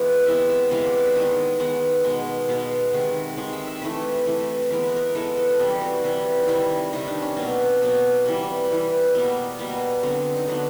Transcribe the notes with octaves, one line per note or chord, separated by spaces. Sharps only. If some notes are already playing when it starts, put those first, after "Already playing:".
Already playing: E3 G#3 B3
C3 E3 G#3 B3 E5
E5
C3 E3 G#3 B3 F5
D5
F5
E5
D#3 G#3 B3 D#5
D#3 G#3 B3 F#5
B2 G#3 B3
B2 G#3 B3 F5
C3 D#3 G#3
C3 D#3 G#3 F5
E5
E5
C3 E3 A3 B4
C3 E3 A3
E3 G#3 B3 A#4
B4
A#4
E3 G#3 B3 A4
A4
A4
C3 E3 G3 G#4
G4
F#4
C3 E3 G3
D#4
C3 D#3 G3 E4
C3 D#3 G3 D#4
D4
C#4
B2 F#3 A#3 C4
B2 F#3 A#3
C3 E3 G3
C3 E3 G3
B2 G3 A#3 B3
B2 G3 A#3
D3 F#3 B3 C4
D#4
D3 F#3 B3 D4